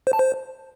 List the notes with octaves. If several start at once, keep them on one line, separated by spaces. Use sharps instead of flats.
C5
A5
C5